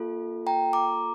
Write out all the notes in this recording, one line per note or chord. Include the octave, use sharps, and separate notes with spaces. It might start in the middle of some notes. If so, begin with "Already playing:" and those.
Already playing: A#3 F4 A4
G5 A#5
A#5 D6